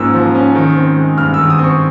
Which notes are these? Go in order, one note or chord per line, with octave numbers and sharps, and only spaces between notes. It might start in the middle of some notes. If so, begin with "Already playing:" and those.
Already playing: G#2 F3 A#3 C#4 E6
F3
C#4
D#3
C4
G#3
G2 F6
D#3 E6
D#6
C4
C#6